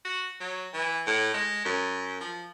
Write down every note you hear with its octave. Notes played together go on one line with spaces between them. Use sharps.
F#4
F#3
E3
A2
G#3
F#2
F3